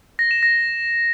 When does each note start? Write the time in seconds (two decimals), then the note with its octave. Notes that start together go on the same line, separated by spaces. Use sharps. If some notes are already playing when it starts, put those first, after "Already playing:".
0.19 A#6
0.31 E7
0.43 A#6